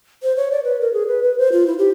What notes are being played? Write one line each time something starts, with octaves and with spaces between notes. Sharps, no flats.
C5
C#5
D5
B4
A#4
G#4
B4
B4
C5
F4
E4
G4